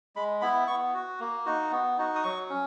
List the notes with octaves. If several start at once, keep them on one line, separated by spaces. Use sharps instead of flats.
G#3 B5
B3 E4 B5
B3 C#6
F#4
A#3
D#4 F#4
B3
D#4 F#4
D#6
F#3 C#6
C#4